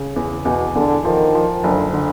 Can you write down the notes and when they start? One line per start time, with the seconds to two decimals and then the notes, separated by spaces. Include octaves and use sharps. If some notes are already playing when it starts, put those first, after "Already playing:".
Already playing: C#3
0.16 E2
0.45 E2 B2
0.75 E2 D3
1.05 D#3 F3
1.35 F3
1.64 F#1 D3
1.93 D3